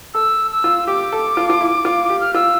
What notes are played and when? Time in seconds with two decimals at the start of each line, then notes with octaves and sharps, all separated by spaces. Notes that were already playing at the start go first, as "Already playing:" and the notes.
0.14 A4 E6
0.52 E6
0.64 F4
0.87 G4 D6
1.12 A4
1.37 F4
1.50 F4
1.61 E4
1.85 F4
2.10 G4
2.21 F6
2.34 F4 E6